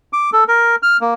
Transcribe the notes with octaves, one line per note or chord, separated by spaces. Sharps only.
D6
A4
A#4
F6
A#3